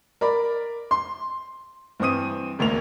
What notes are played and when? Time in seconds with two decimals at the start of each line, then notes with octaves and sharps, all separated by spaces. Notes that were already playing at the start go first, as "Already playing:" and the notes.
0.21 A#4 D5 B5
0.91 C6
2.00 G2 E3 C4 D#6 D#7
2.59 E1 D2 A#3 F7